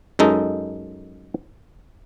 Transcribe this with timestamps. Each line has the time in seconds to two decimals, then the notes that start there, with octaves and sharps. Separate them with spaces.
0.19 F#2 G#3 D#4 A4